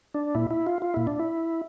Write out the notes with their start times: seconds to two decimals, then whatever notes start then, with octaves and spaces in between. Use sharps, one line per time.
0.14 D4
0.35 A#2 E4
0.51 E4
0.67 F4
0.82 F4
0.94 A#2 E4
1.07 D4
1.19 E4